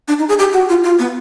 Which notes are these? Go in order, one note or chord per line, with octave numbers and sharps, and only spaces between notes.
D4
D#4
G#4
G4
F#4
F4
F4
B3